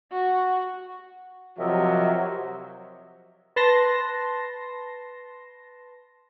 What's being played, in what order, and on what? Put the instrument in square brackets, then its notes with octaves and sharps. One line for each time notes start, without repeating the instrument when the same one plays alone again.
[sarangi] F#4
[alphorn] C3 [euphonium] F3 [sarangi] F#3 [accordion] A#4 D#5 E5
[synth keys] B4 A5 C6 A#6